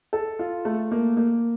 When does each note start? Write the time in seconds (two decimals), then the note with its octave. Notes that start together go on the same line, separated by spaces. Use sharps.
0.13 A4
0.39 F4
0.65 A3
0.92 A#3
1.17 A#3